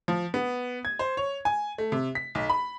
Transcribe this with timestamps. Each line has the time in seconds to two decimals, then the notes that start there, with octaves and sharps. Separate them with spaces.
0.08 F3
0.34 B3
0.85 G#6
0.99 C5
1.17 C#5
1.45 G#5
1.78 A3
1.92 C3
2.15 B6
2.35 B1
2.49 B5